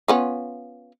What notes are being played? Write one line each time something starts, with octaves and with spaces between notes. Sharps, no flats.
B3 C#4 F4